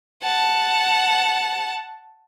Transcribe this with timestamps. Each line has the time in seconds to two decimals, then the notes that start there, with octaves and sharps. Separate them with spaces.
0.23 F#5 A5